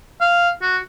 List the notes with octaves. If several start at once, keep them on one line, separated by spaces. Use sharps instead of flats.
F5
F#4